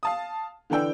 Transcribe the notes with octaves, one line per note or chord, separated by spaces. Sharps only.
F5 A5 D#6
D3 E3 D4 G5 E6